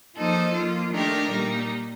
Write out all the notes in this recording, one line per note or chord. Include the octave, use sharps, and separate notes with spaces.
F3 A#3 D#4 A4 C5
F3 A#3 F4
D#3 A3 D4 G4 A#4
A#2 G3 A#3 D#4